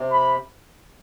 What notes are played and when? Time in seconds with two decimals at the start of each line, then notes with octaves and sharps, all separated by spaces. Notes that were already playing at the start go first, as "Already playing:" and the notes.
Already playing: C3
0.12 B5